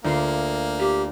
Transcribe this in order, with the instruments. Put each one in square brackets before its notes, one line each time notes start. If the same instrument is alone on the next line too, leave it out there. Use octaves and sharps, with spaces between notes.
[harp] D2 F4 C7 [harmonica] A#3
[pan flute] G4